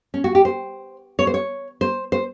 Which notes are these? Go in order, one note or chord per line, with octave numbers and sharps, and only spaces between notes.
C#4
F#4
G4
C5
C#5
C5
C#5
C5
C5